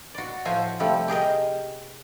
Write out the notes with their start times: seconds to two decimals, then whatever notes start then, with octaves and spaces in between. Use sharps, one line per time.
0.14 F#4 D5
0.45 A2 F3 F4 F#4 C5 G#5
0.80 C3 F3 G3 A3
1.08 G4 G#4 A#4 D#5